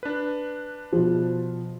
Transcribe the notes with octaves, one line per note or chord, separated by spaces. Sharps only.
D4 B4
B2 F3